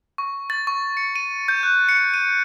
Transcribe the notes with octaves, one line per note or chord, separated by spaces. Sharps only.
C#6
A6
C#6
C#7
D#7
G6
F#6
C#7
D#7